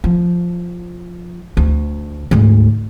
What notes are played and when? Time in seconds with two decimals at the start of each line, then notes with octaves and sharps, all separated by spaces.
0.04 F3
1.57 D2
2.31 D2 G#2